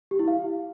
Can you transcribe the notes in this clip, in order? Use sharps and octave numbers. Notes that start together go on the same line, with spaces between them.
G4
E4
F5